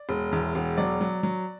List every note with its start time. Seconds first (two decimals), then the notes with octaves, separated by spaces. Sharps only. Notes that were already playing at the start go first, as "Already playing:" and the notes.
Already playing: D5
0.09 E1
0.32 E2
0.55 E1
0.77 F#3 D5
1.01 F#3
1.23 F#3